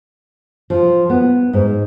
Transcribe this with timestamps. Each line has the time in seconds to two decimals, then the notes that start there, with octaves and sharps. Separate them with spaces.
0.70 F3
1.10 B3
1.53 G#2